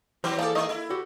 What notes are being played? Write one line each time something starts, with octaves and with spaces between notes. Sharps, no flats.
E3 F#3 C4 G4 C5
F3 A#3 G#4 A4 D5
G#3 A#3 D#4 G#4 D#5
E4
F#4 G4